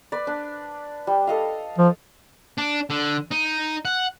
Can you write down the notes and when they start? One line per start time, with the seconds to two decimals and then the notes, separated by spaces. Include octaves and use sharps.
0.12 B4 D5
0.27 D4
1.07 G3
1.27 A4 D#5 F5
1.78 F3
2.58 D4
2.90 D3
3.31 D#4
3.85 F#5